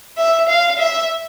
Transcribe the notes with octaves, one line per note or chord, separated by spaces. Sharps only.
E5
F5
E5